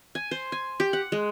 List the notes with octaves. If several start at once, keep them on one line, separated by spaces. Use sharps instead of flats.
G#5
C5
G#5
G4
F#5
G#3